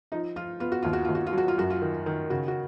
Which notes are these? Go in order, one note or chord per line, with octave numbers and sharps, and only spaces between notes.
F3 D#4
F3 F4
B3 F4
F#4
D#2 F4
F#4
D#2 F4
F#4
F4
F#3 F#4
F4
F#2 F#4
F4
D#3
D#3
C#3 F#4
F#4